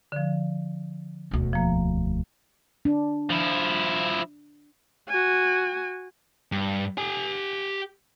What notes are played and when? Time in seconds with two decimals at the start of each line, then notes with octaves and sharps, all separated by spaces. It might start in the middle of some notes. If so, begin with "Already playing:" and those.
0.12 D3 F3
1.31 E1 D2
1.53 F3 A#3
2.85 D4
3.30 F3 E4
5.09 F#4 G#5
6.52 G2
6.98 G4 G#5